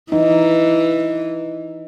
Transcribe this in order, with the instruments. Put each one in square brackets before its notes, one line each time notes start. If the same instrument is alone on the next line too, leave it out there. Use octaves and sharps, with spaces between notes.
[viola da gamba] E3 [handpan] D#4